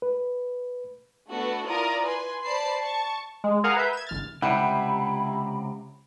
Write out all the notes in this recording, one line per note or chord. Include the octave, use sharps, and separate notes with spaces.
B4
A3 B3 D4 F#4 A4 B4
E4 F4 A#4 D5 A#5 D#6
B4 G#5 C6
C5 D5 A5 B5 C7
A5 C#6
G#3
G#4 A#4 F5 F#5 G#5 A#5
B4 E5 G6
G#6 E7
G1 F6 A6
C#2 C3 G3 E4 G4 F#5 G5 B5